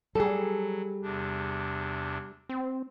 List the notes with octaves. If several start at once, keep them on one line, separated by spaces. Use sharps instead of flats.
F#3 G3 G#4 A4
E2 C3 D4
C4